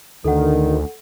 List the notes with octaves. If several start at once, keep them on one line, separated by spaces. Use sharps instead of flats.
D2 D3 D#3 A4 F#5